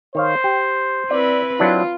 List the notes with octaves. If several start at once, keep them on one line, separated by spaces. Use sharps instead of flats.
D#3 C5 C#5 F5
G4
C4 E4 B4 D5
F#3 C4 D4 E4 F4